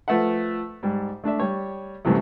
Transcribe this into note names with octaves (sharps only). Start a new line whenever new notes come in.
F3 A3 B4 E5 F#5
G#2 G3
A3 D4 D5 E5
G3 C#5
C2 F#2 C3 E3 A3